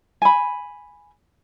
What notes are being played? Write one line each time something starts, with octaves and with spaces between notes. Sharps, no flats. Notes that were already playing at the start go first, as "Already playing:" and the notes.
G#5 B5